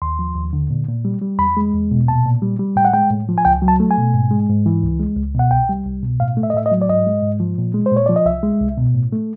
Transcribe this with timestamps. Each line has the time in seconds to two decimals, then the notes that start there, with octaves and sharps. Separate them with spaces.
0.02 D#2 C6
0.19 F3
0.36 D#2
0.53 D3
0.70 A#2
0.88 A#2
1.05 G3
1.22 G3
1.39 E2 B5
1.57 G#3
1.74 E2
1.91 B2
2.07 A#2 A5
2.26 A#2
2.42 G3
2.59 G3
2.76 A2 G5
2.85 F#5
2.93 G#3 G5
3.11 A2
3.29 F3
3.38 G#5
3.45 C#2 G5
3.62 F#3
3.68 A5
3.80 A3
3.91 G#5
3.97 B2
4.14 G#2
4.31 G#3
4.49 G#2
4.66 E3
4.83 C#2
5.00 G#3
5.17 C#2
5.35 B2 F#5
5.51 C2 G5
5.69 G3
5.86 C2
6.03 B2
6.20 A2 F5
6.37 A3
6.43 E5
6.50 D#5
6.54 A2 E5
6.66 D#5
6.72 F#3
6.82 D5
6.89 G#2 D#5
7.07 G#3
7.23 G#2
7.40 F3
7.58 A#2
7.74 G#3
7.86 C5
7.92 A#2 C#5
8.06 F3 D5
8.16 D#5
8.26 C2 E5
8.43 G#3
8.61 C2
8.77 B2
8.94 A2
9.12 A3